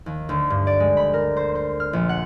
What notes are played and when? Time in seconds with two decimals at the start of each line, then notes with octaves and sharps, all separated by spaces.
0.06 D#2
0.29 D2
0.50 G2
0.67 D5
0.80 G#3
0.97 B5
1.14 A#4
1.37 C5
1.55 C5
1.80 F6
1.93 A#1
2.09 F#5